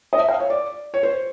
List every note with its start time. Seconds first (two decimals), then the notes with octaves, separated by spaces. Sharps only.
0.13 D#5
0.18 E5
0.29 F5
0.40 C#5
0.50 D5
0.94 C#5
1.03 C5